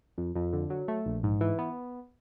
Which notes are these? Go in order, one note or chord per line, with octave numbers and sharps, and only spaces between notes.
F2
F2
D3
F#3
A3
A#1
G#2
E3
B3